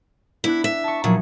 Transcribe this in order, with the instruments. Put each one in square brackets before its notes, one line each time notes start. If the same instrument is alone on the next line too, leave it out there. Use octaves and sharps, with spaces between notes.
[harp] B3 D4 F#6 [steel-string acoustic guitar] E4
[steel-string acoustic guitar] E5
[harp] A5 C#6
[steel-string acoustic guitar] A#2 [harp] F3 F#3 D#4